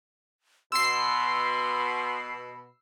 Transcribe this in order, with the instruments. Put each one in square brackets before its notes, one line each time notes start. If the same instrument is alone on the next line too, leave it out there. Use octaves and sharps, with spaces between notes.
[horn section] B2 B5 [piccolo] C6 [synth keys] E6 C7